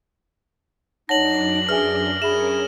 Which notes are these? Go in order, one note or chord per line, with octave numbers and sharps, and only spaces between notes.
F#2 D4 D#4 C#5 F#5 A5 A#6 F#7
G#4 B4 E5 G#5 F6
C#4 G#4 A#4 E5 B5 E7